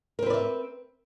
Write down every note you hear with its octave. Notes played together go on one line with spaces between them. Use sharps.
C4 A#4 B4 D5 E5